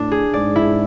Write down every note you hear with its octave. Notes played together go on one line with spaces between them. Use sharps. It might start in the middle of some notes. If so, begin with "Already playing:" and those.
Already playing: A2 D4
G#4
G#2 D5
E4